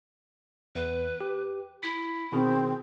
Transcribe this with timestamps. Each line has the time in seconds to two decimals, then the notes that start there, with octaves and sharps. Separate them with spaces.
0.75 E2 B4
1.21 G4
1.83 E4 B6
2.32 B2 D#3 C4 G#4